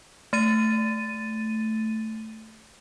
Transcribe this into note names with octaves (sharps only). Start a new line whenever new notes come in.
A3 A6 D#7